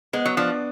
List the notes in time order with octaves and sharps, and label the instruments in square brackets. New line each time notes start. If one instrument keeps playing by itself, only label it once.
[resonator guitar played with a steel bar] G#3 [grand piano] B3
[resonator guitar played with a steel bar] F#3
[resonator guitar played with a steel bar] F3 [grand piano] D4